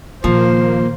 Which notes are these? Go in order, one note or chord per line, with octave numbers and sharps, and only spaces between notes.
A#2 D#3 F3 A#3 C5